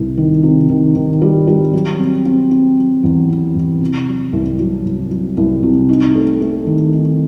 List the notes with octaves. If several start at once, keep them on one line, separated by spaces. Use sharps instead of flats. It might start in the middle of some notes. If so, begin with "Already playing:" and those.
Already playing: C2 C3
D#3
C3
D#3
D#3
G3
G3
F#3
C4
C4
C4
F#3
E2
C4
E2
C3
F#3
C2
F#3
C2
F#3
C2
C3
D#4
A3
A3
D#3
D#4